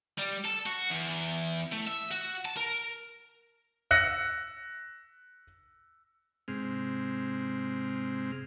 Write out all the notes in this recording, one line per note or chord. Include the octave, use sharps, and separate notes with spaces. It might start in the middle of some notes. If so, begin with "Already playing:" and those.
G3
A4
F#4
E2
A3
E5
F#4
A5
A#4
E6 F#6 A#6 C#7
G#2 C3 G#3 C4 F6